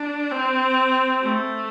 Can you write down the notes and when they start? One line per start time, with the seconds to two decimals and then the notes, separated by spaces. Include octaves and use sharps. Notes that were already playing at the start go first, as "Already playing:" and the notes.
Already playing: D4
0.32 C4
1.21 A3